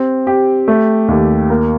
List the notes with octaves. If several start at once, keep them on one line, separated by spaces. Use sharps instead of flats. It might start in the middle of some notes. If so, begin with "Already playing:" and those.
Already playing: C4 G4
G4
A3
D#2
A#3